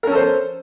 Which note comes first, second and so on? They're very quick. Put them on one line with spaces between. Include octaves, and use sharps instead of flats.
A#4 C#4 A4 C5